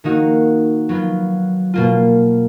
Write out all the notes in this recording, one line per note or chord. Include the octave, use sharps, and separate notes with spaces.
D#3 A#3 D#4 F#4
F#3 B3 F4
B2 A#3 F4